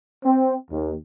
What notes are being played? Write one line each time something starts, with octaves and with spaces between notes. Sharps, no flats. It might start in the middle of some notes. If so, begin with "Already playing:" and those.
C4
D#2